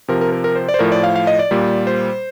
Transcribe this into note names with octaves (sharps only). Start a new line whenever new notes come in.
C3 F3 A#4
A#4
A#4
A#4
C5
D5
C5
A2 F3 A#4
D5
F5
F5
D#5
D5
A#2 G3
C5